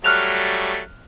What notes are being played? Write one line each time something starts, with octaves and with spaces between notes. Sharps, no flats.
F#3 G3 A3 F6 F#6 F7